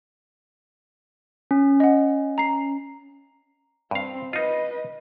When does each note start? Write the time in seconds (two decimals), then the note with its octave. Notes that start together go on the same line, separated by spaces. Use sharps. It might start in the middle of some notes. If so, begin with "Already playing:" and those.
1.51 C#4
1.80 D#5 F#5
2.38 A#5 C7
3.91 G2 C4 F5
4.33 D#4 F4 B4 D#5